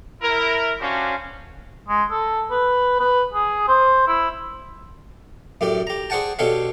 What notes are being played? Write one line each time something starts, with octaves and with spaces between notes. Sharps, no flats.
E4 A#4
C#4 D4 F#4 G4 C5 F5
G#3
A4
B4
B4
G#4
C5
E4
F#2 A2 G4 D5
G4 A#5
G#4 C5 D5 F#5 G5 A5
B2 D4 G4 A4 C#5 F5